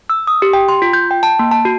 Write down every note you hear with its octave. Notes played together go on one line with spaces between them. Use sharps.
E6
D#6
G4
G5
C6
F4
G6
G5
A5
A#3
A5
F#4